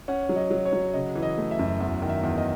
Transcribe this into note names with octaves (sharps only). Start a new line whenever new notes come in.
C#4 F#5
F#3
D#5
F#3
C#5
F#3
C#3 D#5
E3
D#5
A3
E5
F#2
E2 E5
D#3
E5
E2
D#5